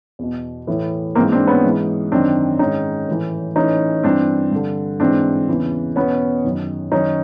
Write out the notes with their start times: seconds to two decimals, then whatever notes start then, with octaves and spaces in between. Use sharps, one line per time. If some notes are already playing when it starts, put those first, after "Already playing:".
0.19 E2 B2
0.67 A2 E3
1.15 G#2 E3 A#3 C4
1.32 C4 D4
1.47 B3 C#4
1.64 G#2 E3
2.12 F#2 D#3 C4 D4
2.59 G#2 D#3 C#4 D#4
3.08 A2 E3
3.56 A2 E3 C#4 D#4
4.03 G2 E3 C4 D4
4.51 G2 D3
5.00 G#2 E3 C4 D4
5.49 E2 C#3 E3
5.96 E2 B2 B3 C#4
6.44 F#2 D#3
6.92 F#2 D#3 C#4 D#4